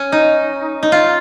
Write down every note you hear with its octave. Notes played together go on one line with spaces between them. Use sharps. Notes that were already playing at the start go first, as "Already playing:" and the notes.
Already playing: C#4
D#4
D#4
F4